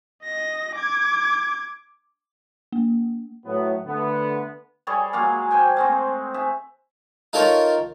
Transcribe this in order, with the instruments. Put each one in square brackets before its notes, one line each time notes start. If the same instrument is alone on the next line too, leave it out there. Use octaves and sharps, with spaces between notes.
[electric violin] D#5 A#6
D6 G#6
[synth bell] A#3
[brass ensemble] A2 F#3 B3
D3 A3 B3
[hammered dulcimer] G3 G#4 A4 C#5
F#3 G#3 A#3 F5
C5 G5 G#5
G#3 A3 C4
G#4 E5
[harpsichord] D#4 F4 A4 A#4 C#5